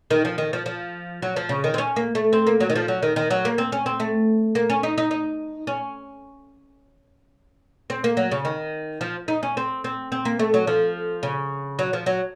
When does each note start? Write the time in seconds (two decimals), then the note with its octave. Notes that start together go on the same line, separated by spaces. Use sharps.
0.11 D#3
0.25 F3
0.38 D#3
0.53 F3
0.66 F3
1.22 F#3
1.36 F3
1.49 C#3
1.64 D#3
1.74 C4
1.78 C#4
1.96 A#3
2.15 A3
2.33 C4
2.47 A#3
2.60 F#3
2.70 D#3
2.76 F3
2.88 F#3
3.03 D#3
3.16 D#3
3.31 F#3
3.45 A#3
3.58 C4
3.72 C#4
3.86 C4
4.00 A3
4.55 A#3
4.70 C#4
4.83 D#4
4.98 D#4
5.11 D#4
5.67 C#4
7.90 C4
8.04 A#3
8.17 F#3
8.31 C#3
8.45 D#3
9.01 F3
9.28 D#4
9.43 C#4
9.57 C4
9.84 C4
10.12 C4
10.25 A#3
10.39 A3
10.54 F#3
10.67 F3
11.23 C#3
11.79 F#3
11.93 F3
12.06 F#3